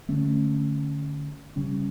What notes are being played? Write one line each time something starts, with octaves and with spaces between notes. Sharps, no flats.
D3 A3 C#4
C#3 G3 C#4